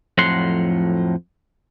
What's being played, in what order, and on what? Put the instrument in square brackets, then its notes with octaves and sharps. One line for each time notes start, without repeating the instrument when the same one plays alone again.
[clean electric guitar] F2 A2 F3 F#3 F#5 C6